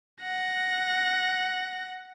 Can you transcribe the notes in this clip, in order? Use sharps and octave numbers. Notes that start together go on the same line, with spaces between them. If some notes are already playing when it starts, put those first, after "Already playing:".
F#5 A#6